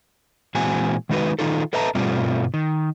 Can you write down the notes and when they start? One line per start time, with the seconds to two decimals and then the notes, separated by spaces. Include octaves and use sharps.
0.55 A#2 E3 G#3 C4 F#4 G#5
1.09 D#3 G#3 D#4 F#4 B4
1.39 D#3 D#4 F4 A4
1.73 A4 B4 D#5 E5 A5 A#5
1.95 G2 B2 G3 A3 C4 F4
2.54 D#3